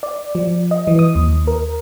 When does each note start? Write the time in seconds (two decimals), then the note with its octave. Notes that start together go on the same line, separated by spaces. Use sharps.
0.03 D5
0.35 F3
0.71 D#5
0.87 E3
0.99 D#6
1.15 D#2
1.47 A#4